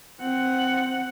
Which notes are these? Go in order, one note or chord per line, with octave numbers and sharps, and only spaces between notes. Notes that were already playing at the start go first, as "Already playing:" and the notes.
C4 F#5